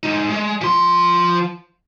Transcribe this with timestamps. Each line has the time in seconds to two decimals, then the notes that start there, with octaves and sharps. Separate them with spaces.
0.03 G#3 D#4
0.30 G#3
0.61 F3 C6